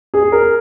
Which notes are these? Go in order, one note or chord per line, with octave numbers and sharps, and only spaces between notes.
G#4
A#4